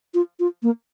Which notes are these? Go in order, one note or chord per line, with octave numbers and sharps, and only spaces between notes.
F4
F4
A#3